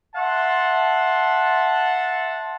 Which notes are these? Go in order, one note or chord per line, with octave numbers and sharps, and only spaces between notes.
E5 F#5 A5 C6